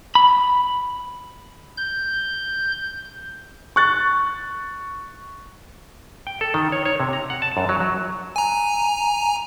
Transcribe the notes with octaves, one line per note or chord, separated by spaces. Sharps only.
B5
G6
C#6 F#6 A6
G5
A4
D#3
C#5
C#5
C3
A#5
F#5
A5
F#2
F#3
F#3
G#5 A#5